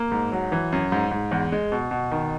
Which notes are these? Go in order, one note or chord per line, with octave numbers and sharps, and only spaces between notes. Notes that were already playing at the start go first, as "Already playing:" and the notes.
Already playing: A#3
G#2
F#3
E3
F#2
G#2
G#2
E2
G#3
B2
B2
D#3